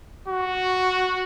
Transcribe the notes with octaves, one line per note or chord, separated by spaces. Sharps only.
F#4